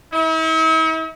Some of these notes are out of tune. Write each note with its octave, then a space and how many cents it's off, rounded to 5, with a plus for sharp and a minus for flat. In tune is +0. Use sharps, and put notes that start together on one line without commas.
E4 -45